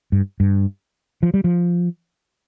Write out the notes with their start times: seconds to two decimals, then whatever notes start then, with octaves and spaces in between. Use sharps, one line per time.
0.12 G2
0.40 G2
1.23 F3
1.34 G3
1.44 F3